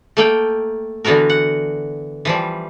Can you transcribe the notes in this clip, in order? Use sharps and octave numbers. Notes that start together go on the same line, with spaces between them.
A3 A#3 G5
D3 E3 B3 F#4 A#4
F#5
E3 F3 G3